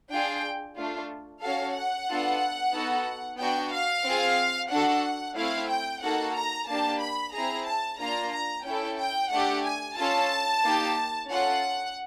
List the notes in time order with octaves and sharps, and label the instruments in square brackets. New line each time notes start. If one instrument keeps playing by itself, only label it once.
[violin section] D4 F4 G#4 G5
A3 D4 F4
C#4 F#4 A4 F5
F#5
B3 D4 F4 A4
B3 D#4 F#4 A4
B3 D4 F#4 G5
F5
C4 F4 G#4
D4 F#4 A4 F#5
A3 C4 E4 F5
G5
A#3 D#4 F#4 A4 F#5
A#5
A#3 D4 G4 A5
B5
C4 E4 G#4 A#5
A5
A#3 D4 F4 A#5
A#5
C#4 E4 A4 G5
G5
A3 D4 G4 F#5
G#5
C#4 F4 A4 A5
A#3 D#4 G4
C#4 F4 A4 F#5